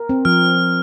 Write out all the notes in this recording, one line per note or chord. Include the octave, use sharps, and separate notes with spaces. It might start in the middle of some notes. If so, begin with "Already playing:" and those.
Already playing: A#4
C4
F3 F6